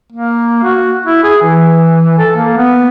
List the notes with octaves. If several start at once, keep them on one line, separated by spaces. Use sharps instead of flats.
A#3
F#4
E4
G#4
E3
A4
A#3
B3